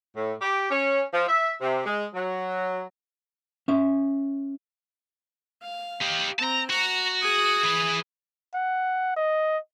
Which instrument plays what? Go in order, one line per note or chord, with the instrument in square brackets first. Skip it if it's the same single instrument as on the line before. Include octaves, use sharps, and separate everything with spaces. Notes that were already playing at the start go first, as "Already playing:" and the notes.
[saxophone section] A2
G4
C#4
F3
E5
C3
G#3
F#3
[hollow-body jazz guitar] C#4 E5
[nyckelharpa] F5
[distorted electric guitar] D#4 G4
[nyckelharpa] C4 [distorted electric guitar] A5 A#5
[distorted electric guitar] F#4 [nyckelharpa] A#5
[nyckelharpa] G#4 D#6
[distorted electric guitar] E3 B4
[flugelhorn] F#5
D#5